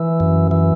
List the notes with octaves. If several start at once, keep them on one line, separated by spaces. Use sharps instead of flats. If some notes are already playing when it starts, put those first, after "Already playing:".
Already playing: E3
F#2
E3